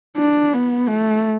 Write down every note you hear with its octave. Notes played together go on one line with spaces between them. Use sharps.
D4
B3
A3